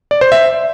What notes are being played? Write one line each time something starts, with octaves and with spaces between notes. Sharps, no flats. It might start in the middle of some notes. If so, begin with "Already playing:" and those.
D5
C5
E5